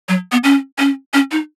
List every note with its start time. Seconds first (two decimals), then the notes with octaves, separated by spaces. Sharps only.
0.09 F#3
0.32 B3
0.44 C#4
0.79 C#4
1.14 C#4
1.31 D#4